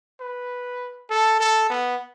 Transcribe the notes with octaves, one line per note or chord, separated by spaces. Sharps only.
B4
A4
A4
B3